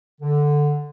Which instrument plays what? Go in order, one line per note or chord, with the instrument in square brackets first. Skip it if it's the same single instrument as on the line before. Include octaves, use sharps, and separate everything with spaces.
[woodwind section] D3